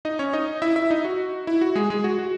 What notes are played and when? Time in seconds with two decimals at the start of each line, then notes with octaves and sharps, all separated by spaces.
0.05 D#4 D#5
0.19 C#4 C#5
0.33 D#4 D#5
0.62 E4 E5
0.76 E4 E5
0.91 D#4 D#5
1.05 F#4
1.47 E4
1.61 F#4
1.75 G#3 G#4
1.90 G#3 G#4
2.04 F#4
2.18 F#4